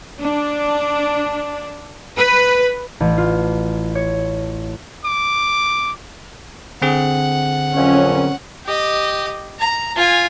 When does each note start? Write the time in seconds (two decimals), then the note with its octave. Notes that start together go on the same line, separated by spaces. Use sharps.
0.20 D4
2.16 B4
3.00 A1
3.18 F4
3.95 C#5
5.05 D6
6.82 D3 C4 G#4 F#5
7.77 F2 A#2 F#3 C#4
8.66 G4 D#5
9.59 A#5
9.96 F4 G#5